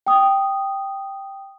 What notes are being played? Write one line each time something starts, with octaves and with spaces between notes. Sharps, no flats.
G5 D#6